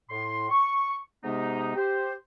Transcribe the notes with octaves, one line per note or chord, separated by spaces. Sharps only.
A2 C6
C#6
G#2 C3 G#3 B3 D#4
G4 C5